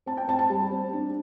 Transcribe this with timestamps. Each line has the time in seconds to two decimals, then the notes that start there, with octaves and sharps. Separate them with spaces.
0.06 C4 A5
0.17 G5
0.28 C4 A5
0.39 A5
0.50 G3
0.71 C4
0.93 D4